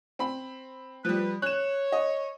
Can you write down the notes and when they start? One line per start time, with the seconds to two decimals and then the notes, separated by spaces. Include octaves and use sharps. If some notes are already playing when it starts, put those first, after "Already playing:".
0.19 C4 B5
1.05 F3 G3 B4
1.42 C#5 F#6 E7
1.92 D#5